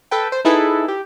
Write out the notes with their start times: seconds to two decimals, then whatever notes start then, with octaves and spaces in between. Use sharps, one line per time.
0.11 A4 B4 G5
0.32 C5
0.45 D#4 E4 G#4 A4 B4
0.88 G4